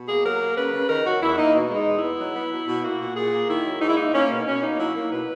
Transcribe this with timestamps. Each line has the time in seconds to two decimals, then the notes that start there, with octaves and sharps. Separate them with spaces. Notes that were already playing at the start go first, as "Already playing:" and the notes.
Already playing: B2
0.08 A#3 G#4
0.24 F#3 A#4
0.41 A#3
0.57 C#3 B4
0.73 C#3
0.89 D#3 A#4
1.05 F#3 F#4
1.22 E2 E4
1.38 A#3 D#4
1.54 B2
1.70 G#3
1.76 D#4
1.86 E2
1.98 E4
2.03 B3
2.19 F#3
2.35 B3
2.52 B2
2.68 B2
2.84 A#3 F#4
3.00 A#2
3.16 A#2 G#4
3.33 A#3
3.49 D#3 E4
3.65 F#3
3.81 G#2 D#4
3.89 E4
3.96 A#3 D#4
4.14 A#3 C#4
4.30 B2
4.46 B2 C#4
4.63 A#3 D#4
4.79 F#3 E4
4.95 A#3
5.12 B2 B4